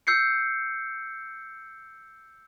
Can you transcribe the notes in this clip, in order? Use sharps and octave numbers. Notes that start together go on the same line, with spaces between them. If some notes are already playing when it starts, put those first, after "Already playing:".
E6 G6 C7 C#7